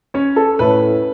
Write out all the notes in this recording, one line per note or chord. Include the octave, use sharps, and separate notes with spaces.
C#4 C#5
A4
A2 A3 C#4 B4